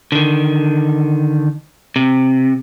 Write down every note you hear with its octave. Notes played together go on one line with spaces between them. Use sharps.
D3 D#3
C3